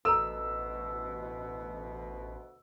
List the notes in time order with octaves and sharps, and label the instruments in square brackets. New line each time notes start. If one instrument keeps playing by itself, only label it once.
[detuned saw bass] A1 [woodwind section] D2 B2 [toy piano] A4 B4 A#5 [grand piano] E6